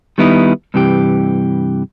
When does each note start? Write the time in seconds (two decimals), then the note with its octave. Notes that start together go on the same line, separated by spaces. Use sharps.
0.18 D#3 G3 B3 D#4 E4
0.74 G2 C3 E3 G4